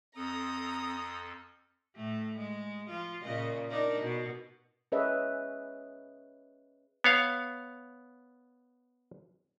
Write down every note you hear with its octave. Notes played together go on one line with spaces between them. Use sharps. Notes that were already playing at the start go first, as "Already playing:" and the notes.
F2 C4 A4 A#5 D#6
A2 A3
G#3
F3 F4
A#2 C#3 D#5
D4 D#4 A#4
B2
C#4 G#4 B4 C#5 D#5 E5
B3 C#5 F5